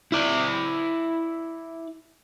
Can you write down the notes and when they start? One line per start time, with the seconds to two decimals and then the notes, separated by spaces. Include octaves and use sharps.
0.12 E4 D5